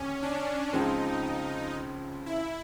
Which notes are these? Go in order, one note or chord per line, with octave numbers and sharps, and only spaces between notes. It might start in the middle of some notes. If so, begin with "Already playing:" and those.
Already playing: D#2 D3 C#4
D4
C#2 C#3 F3 G#3 C4 D#4
E4